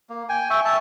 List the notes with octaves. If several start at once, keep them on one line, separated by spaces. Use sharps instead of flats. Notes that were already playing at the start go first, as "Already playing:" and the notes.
A#3
G5 G#5
E5 G5 C#6
E5 A5